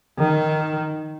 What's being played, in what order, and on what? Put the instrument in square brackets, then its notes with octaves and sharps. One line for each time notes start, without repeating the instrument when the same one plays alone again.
[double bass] D#3